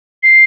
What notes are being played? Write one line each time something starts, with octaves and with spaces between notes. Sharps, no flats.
C7